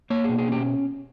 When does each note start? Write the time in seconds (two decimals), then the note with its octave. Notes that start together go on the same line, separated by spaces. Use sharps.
0.10 A#3 C#5
0.24 B2 G#4
0.39 G#4
0.48 C#4 G4